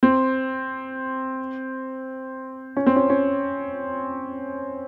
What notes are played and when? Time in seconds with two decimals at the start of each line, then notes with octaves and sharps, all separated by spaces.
0.03 C4
2.77 C#4
2.86 C4
2.96 C#4
3.10 C#4